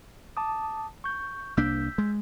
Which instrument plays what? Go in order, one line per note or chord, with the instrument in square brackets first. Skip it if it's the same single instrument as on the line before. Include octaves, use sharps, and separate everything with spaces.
[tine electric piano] A5 D6 D#6
C#6 G6
[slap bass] C2 A#3 D4 [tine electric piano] E6 G6 B6
[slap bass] G#3